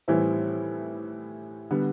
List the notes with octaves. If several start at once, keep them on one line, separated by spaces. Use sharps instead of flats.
A2 E3 G3 C4 E4
D3 G3 B3